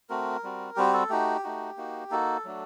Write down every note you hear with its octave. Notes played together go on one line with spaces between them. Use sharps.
A3 C4 F#4 A#4
G3 C4 F#4
G3 C4 F#4 G4
A4
A3 D#4 F#4 G4
A3 D#4 F#4
A#3 D#4 F#4
A#3 D#4 F#4 A4
F#3 A3 D4 F#4